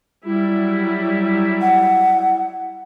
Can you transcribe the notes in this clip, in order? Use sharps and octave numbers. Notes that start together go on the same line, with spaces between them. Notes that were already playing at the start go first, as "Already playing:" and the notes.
F#3 G3 E4
F#5